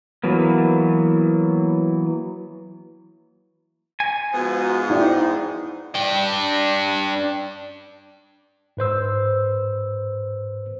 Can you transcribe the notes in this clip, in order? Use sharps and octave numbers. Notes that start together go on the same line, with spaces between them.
E3 F#3 A#3 B3
G#5
G#2 F3 B3 F#4
D#4 E4 D5 G5
D4 G5
G#2 B4 C5 E6